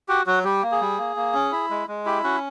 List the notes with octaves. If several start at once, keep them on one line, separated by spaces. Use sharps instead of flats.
F#4 G4
F#3 F#4
G3 G4
A#3
G#4
G3
A#3
A#3
C#4
E4
G#3
G#3
E4 G4
C#4 F#4